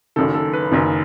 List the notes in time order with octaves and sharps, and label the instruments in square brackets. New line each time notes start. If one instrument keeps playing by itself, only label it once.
[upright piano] F#1 F#2 D#3 A4
A4
B4
F#1 F#2 D#3